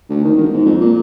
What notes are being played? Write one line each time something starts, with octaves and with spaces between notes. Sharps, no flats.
D2
D#3
E1
G#2
F2
A#2